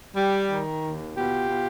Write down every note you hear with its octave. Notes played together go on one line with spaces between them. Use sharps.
G3
D#3
D#2
B2 F4 G4
B2